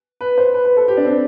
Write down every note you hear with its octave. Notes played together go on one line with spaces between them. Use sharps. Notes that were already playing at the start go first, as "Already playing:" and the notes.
B4
C5
B4
B4
A4
G4
D4
C4